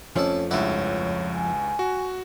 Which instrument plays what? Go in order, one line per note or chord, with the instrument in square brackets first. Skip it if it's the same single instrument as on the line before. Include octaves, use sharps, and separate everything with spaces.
[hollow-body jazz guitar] F2 F3 A3 [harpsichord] C#4 A4 A5
[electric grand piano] C#2 G2 [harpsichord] E4 F#4 D5 [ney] C#5
[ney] G#5
[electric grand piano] F#4